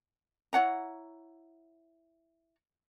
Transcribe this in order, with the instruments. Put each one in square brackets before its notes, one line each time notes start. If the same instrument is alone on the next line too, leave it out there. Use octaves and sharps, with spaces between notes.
[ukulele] E4 C#5 F#5 A#5